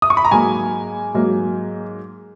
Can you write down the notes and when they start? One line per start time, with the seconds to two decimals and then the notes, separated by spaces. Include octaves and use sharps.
0.02 D#6
0.10 C#6
0.17 B5
0.25 A#5
0.31 G#2 F#3 A#3 G#5
1.15 G#2 F#3 A#3